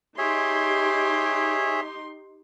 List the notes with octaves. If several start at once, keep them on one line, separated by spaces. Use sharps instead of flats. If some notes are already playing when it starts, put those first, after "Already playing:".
D#4 G4 G#4 C#5 E5 C6